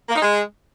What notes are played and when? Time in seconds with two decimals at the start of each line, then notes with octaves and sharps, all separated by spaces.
0.09 A#3
0.16 D#4
0.22 G#3